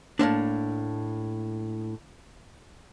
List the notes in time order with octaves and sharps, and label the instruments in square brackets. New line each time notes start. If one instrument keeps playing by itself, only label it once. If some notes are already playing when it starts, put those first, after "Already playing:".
[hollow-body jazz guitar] A2 A#3 C4 D4